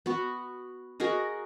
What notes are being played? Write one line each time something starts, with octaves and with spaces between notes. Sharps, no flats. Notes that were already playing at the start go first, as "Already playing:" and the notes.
B3 F#4
F#4 G#4 A#4 D#5